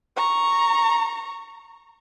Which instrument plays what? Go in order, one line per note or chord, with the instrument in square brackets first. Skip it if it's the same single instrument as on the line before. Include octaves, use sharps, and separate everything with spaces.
[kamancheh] A#5 C#6